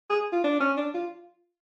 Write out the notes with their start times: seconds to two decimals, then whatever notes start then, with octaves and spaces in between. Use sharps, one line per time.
0.10 G#4
0.32 F4
0.44 D4
0.60 C#4
0.77 D4
0.94 F4